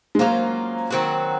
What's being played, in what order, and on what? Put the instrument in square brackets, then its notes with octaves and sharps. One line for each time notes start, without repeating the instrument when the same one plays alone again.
[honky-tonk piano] G#3
[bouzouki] F#3 C#4 F4 C5 [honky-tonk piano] A#3
[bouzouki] D#3 F#3 C4 F#4